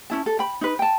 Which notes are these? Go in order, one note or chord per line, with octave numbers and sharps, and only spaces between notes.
C#4 E4 A5
A4
G5 B5
D#4 B4
G5 A5